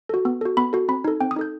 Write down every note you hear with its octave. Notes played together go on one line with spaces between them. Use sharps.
F#4 A4
B3
F#4 A4
B3 B5
F#4 A4
C4 B5
D#4 A4
C4 G5
D#6
D#4 A4 G6